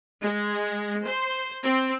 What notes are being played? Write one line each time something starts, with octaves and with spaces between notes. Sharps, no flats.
G#3
C5
C4